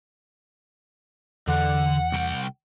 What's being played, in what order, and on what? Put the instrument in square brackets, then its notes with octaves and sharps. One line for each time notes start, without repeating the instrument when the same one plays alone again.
[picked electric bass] E2 [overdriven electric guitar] D3 [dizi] F#5
[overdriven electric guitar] C2 G5